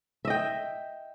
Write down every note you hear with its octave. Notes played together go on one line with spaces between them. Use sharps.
D#5 E5 G5